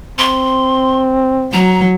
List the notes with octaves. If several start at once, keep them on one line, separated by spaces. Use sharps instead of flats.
C4 C6
F#3 A#5